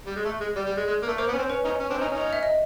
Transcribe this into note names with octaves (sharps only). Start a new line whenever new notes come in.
G3
G#3
A3
G#3
G3 D5
G3
G#3
G#3
A#3
A3
A#3 C5
B3
C#4
C4
C#4 B4
C#4 D#4
C#4
C4 D4
C#4 D#4
C#4 D#4
E5
D#5